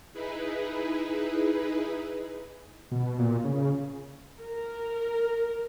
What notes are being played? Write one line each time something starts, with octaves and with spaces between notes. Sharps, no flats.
D#4 E4 G#4 B4
B2
A#2
C#3
A#4